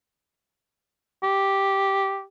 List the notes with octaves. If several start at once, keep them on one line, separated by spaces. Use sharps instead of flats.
G4